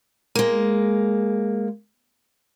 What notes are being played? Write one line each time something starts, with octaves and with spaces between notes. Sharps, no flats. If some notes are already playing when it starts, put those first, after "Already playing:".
G#3 A#3